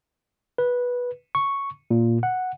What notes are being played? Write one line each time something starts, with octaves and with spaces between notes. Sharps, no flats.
B4
C#6
A#2
F#5